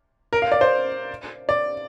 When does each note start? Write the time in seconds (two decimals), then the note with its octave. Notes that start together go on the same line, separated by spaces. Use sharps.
0.33 A#4
0.42 F5
0.52 D5
0.61 C5
1.49 D5